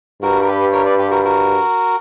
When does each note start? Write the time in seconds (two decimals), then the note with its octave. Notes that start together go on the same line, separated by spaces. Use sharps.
0.22 G2 F#4 A#4
0.42 A#4
0.47 G4 B4
0.72 A#4 C#5
0.85 B4 D5
0.98 G4 B4
1.11 F#4 A#4
1.24 F#4 A#4